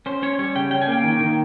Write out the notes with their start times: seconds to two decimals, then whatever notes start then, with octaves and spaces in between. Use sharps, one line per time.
0.06 C#4 C5
0.23 C#4 C#5
0.39 G3 C#5
0.55 C#3 G5
0.71 C#4 G5
0.82 G#5
0.88 A#3 G5
1.04 D#3
1.20 D#3